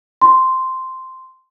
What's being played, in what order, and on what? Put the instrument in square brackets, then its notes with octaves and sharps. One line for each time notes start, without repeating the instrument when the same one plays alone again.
[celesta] C6